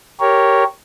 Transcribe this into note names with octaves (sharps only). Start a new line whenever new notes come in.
G4 A#4 C#5